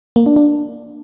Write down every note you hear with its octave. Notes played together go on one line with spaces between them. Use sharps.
A#3
D4
D4